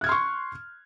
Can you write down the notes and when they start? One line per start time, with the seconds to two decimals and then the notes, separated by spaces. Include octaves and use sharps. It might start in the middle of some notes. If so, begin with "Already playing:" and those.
0.01 F#6
0.04 G#6
0.06 F6
0.09 C6
0.12 C#6